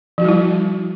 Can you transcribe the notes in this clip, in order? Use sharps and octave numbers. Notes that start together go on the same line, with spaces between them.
F3 G3 E4 F#4